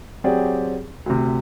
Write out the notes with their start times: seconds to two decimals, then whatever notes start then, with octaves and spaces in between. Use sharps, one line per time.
0.24 F#3 C4 G4 G#4 D5
1.06 D2 C3